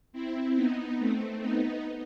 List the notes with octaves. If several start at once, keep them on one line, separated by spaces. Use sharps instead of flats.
C4 E4
B3 D#4
A3 C4
B3 D#4